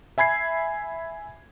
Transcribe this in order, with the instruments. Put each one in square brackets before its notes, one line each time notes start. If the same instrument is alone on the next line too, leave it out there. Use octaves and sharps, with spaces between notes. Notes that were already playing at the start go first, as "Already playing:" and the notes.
[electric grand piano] E5 G#5 B5 G#6 C7